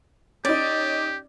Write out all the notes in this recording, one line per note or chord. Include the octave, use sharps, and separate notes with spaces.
C#4 D#4 G4 D5